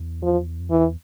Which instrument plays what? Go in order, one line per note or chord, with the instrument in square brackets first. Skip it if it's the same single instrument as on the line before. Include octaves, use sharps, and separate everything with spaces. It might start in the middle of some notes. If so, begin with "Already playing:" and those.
Already playing: [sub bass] E2
[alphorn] F3
[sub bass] F2
[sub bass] E2 [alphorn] E3